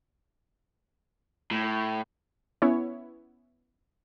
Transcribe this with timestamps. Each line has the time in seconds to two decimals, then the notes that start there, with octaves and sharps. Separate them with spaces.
1.51 A2
2.62 B3 C#4 E4 C#5